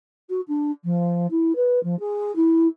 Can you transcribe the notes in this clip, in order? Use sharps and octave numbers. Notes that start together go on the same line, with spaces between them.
F#4
D4
F3
E4
B4
F3
G#4
E4